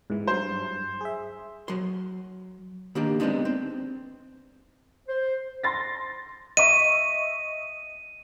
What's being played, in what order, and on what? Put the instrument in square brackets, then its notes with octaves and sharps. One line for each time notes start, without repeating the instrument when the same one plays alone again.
[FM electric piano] G#2 E3
[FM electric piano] G2 F#3 [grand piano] C5
[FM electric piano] G#4 E5
[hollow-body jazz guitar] F#3 C6
D#3 A#3 D4 G4
G#3 B3 C4 D4 D#4
C4
[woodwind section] C5
[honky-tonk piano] C6 A6 A#6
[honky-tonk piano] D#5 E5 C#6 [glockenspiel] D#7